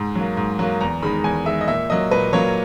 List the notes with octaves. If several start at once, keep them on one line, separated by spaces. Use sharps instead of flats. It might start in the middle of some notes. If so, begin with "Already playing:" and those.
Already playing: G#2
F#3 A#3
G#2
F#3 A#3
E2 A#5
D#3 G#3 B5
E2 G#5
D#3 G#3 E5
D#5
A#2 E5
F#3 A#3 D#5
A#2 B4
F#3 A#3 C#5